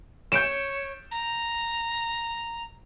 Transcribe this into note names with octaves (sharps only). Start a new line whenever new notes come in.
C#5 G6 D7 E7
A#5